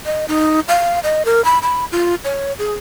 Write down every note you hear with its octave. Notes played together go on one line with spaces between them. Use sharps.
D#5
D#4
F5
D#5
A#4
B5
B5
F4
C#5
G#4